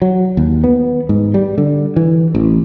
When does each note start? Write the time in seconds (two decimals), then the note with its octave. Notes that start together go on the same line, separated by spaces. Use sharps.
0.02 F#3
0.37 D#2
0.64 B3
1.09 G#2
1.34 G3
1.58 D3
1.96 E3
2.35 A1